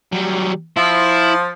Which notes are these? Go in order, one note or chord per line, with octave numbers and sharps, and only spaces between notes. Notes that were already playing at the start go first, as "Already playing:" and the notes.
F#3 G3
F3 E4